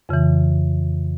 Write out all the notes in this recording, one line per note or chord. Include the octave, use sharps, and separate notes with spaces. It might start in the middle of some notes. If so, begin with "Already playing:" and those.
F2 C#3 E3